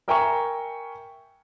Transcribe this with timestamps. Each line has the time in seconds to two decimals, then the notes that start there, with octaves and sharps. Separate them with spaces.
0.08 A#4 E5 G5 G#5 A#5 C#6